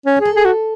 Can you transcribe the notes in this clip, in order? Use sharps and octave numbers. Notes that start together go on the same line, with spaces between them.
C#4
C#5
G#4 A4
G#4
F#4